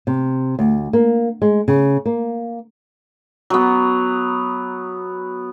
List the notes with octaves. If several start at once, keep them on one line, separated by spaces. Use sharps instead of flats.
C3
D2
A#3
G#3
C#3
A#3
F#3 B3